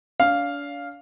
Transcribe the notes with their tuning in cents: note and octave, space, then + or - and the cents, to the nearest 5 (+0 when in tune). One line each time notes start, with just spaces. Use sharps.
D4 -40 F5 +0